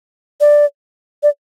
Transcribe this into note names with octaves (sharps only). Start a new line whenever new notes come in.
D5
D5